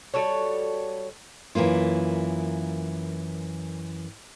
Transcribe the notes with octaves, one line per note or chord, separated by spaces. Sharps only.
G3 F#4 A4 C#5
F#2 E3 G3 A#3 F4